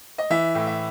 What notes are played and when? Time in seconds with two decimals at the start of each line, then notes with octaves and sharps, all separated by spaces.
0.18 D#5
0.30 E3 E5
0.55 A2
0.67 E5